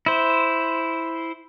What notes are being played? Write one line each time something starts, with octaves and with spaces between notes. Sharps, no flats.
E4 C5